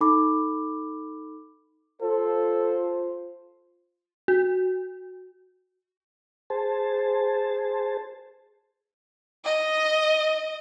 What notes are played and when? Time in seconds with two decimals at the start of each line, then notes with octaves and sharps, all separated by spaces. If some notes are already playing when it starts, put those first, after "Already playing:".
0.01 D#4 A4 B5 D6
2.01 F4 A4 C5
4.28 F#4
6.50 G#4 C5 A5
9.45 D#5